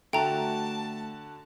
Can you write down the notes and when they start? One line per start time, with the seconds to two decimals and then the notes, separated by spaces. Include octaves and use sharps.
0.13 D3 A3 F#4 G5 A5 A#5